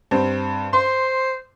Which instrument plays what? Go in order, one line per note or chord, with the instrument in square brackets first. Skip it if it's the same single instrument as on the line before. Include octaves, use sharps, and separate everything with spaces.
[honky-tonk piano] G2 C4
[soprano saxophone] C5 [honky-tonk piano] C6